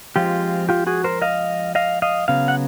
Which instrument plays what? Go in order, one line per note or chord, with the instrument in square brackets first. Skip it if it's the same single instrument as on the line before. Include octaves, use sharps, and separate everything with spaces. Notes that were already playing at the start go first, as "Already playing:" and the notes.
[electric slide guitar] F3 G#3 C4 F4 G4
F4 G4
F#4 G#4
A#4 C5
D#5 F5
D#5 F5
D#5 F5
C#3 F#3 B3 F5
F#5